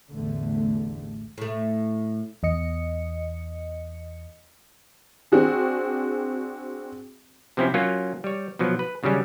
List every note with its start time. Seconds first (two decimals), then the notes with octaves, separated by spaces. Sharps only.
0.11 A1 E2 D3 A3
1.38 A2 A3
2.43 E2 D#5 C#7
5.32 C4 D4 F#4 G#4
7.57 C3 F3 C4 C#4 E4
7.74 F#3 A#3 C#4 F4
8.24 G3 C#5
8.59 B2 F3 F#3
8.79 B4
9.03 D#2 C#3 F#3 G3 C#4